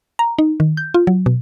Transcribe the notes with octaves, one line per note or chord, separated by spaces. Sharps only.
A#5
D#4
D#3
G6
F4
F#3
B2